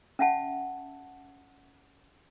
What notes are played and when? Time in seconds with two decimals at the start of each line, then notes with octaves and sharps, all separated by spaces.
0.19 C#4 E5 F#5 A5